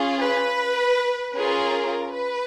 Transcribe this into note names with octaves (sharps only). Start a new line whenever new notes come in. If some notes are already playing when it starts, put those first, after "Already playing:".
Already playing: C#4 F4 G#4
B4
C#4 F4 G#4 A#4
B4